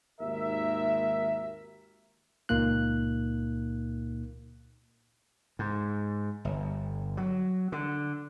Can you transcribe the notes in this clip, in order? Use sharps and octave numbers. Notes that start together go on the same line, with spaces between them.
G#1 D#2 A#4 E5
C#2 A#2 A#3 D#4 F#6
G#2
G1
F#3
D3